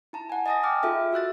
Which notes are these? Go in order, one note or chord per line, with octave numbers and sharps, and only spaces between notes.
E4 A5 A#5
F#5 G#5
D#5 G#5 A5 D#6 A#6
G5 D6 F6
F4 G#4 A4 E5
F#4 E6 F#6 A6